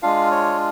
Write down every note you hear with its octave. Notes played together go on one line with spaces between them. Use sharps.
G#3 D4 F4 F5
C#5